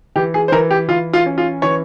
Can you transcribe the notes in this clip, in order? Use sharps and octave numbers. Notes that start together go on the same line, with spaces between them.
E3 G4
G#4
C5
E3 A#4
G4
E3 F4
F4
C#4
F4
E3 C#5